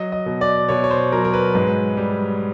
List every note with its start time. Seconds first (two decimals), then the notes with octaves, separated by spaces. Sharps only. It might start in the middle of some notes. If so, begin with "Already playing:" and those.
Already playing: F#3 D#5
0.12 D#5
0.26 B2
0.41 D5
0.69 B2 C#5
0.84 C#5
0.91 C5
1.12 F#3 A#4
1.24 A#4
1.33 B4
1.54 G#2 B4
1.97 G3